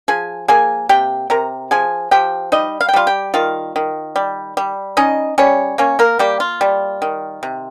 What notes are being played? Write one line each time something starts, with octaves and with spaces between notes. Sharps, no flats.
F3 G#4 G#5
A#3 G#4 G#5
C3 G4 G5
C3 A#4 A#5
F3 G#4 G#5
F3 G4 G5
G3 D#4 D#5
F5
G5
G3 F4 F5
G4 G5
D#3 F4 F5
D#3
G3
G3
C#4 D#4 D#5
G3 C#4 C#5
A#3 C#4 C#5
A#3 A#4
G3 A#3 G4
F4
G3
D#3
C3